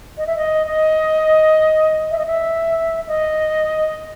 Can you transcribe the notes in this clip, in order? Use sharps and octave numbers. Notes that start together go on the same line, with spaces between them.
D#5
E5
D#5
D#5
E5
D#5
E5
D#5